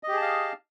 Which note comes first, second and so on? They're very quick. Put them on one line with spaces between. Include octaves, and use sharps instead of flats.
D#5 G4 G#4 A5 F5